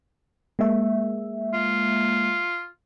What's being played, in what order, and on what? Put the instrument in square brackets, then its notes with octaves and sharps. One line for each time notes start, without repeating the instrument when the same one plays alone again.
[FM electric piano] G#3 A#3 E5
[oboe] F4